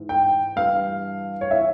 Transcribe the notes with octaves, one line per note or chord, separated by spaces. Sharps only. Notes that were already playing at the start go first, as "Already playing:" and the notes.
Already playing: G#2 E3
G5
G2 E3 F5
C#5
E3 E5